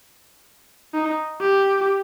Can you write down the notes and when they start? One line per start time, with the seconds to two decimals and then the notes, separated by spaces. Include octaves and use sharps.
0.94 D#4
1.41 G4